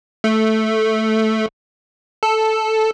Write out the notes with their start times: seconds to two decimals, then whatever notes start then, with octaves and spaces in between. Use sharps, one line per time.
0.24 A3
2.23 A4